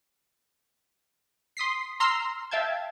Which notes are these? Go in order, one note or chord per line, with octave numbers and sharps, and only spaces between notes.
C6 D#6 B6 C7
A#5 C6 E6 F6
E5 F5 G5 A5 G#6